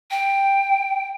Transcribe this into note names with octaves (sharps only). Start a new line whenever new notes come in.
G5